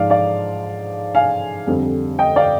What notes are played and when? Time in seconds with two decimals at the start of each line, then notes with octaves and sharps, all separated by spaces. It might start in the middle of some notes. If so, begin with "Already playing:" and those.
Already playing: G#2 F3 D5 F5
0.10 D5 F5
1.15 F5 G#5
1.67 F2 D3 G3
2.19 D#5 G5
2.36 D5 F5